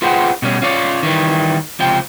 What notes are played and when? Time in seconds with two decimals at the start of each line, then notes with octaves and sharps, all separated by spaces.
0.02 F4 G#4 B4 C5 F#5 G5
0.42 B2 G3 C#4
0.62 C#4 F4 C#5 D5
1.03 D#3 E3 G3
1.80 C#2 C3 F3 G5